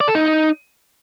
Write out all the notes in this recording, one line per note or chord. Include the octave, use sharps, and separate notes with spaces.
D5
A4
D#4